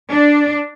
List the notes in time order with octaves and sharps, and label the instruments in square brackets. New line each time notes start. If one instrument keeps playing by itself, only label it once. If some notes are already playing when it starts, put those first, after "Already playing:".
[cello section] D4